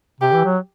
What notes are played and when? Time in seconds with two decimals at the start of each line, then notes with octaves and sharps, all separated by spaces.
0.20 C3 G4
0.33 E3
0.45 F#3